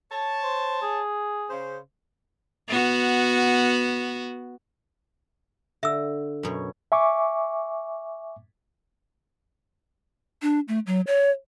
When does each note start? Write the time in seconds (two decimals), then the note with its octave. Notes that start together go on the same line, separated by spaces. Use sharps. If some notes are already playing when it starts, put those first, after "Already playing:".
0.12 C#5 A5
0.43 C5
0.82 G#4
1.50 C#3 C5
2.69 B3 F#4
5.83 D3 E5 E6
6.43 F#2 B2 C#5
6.92 E5 G#5 C#6 D6
10.42 D4
10.68 A3
10.87 F#3
11.07 C#5